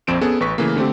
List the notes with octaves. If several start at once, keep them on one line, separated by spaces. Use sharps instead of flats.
A#1 F2 C4 D7 E7
B3 C#4 G#4 A4
A1 B4 C#6 B6
C#3 E3 A3 A#3
D3 A3 C4 G4